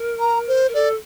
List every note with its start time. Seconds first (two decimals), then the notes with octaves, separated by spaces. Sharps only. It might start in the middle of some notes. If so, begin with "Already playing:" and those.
Already playing: A#4
0.20 A#5
0.48 C5
0.68 A#4
0.74 A4 D5